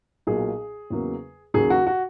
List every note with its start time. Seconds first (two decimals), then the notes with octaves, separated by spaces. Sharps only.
0.27 B1 A#2 F#3 G#4
0.90 E2 C#3 F#3 A#3
1.54 D#2 C#3 F#3 G#4
1.70 F#4
1.87 F#4